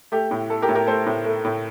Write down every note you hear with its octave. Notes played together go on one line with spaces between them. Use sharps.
A3 G4
A2
A3 A4
G4 A#4
A2
G4 A#4
A3 A4 C5
A2
A3
A2